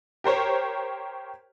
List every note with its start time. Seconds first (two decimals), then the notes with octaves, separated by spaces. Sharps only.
0.24 G4 A#4 C5 C#5